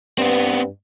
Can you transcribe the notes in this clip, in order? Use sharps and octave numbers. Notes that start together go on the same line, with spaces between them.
G2 B3 C4